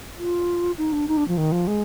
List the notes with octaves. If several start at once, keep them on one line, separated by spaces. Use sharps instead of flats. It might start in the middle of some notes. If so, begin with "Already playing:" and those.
F4
D#4
D4
D#4
D4
F3
D#3
F3
G#3